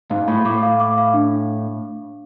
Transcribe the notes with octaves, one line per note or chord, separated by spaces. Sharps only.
G#2 F5
A2 B5
A2 D6
F5
D6
F5
D4